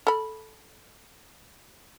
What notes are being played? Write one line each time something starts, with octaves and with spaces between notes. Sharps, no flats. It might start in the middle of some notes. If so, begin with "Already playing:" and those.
A4 B5